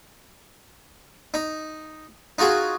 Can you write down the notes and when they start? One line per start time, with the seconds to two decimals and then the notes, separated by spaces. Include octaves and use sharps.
1.34 D#4
2.38 D#4 F4 F#4 G#4